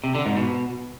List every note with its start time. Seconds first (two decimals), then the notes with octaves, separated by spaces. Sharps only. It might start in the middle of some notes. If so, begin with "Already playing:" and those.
0.04 C3
0.15 D3
0.26 G#2
0.37 B2